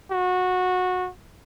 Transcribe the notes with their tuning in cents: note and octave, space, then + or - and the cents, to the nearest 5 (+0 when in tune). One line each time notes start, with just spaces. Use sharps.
F#4 -20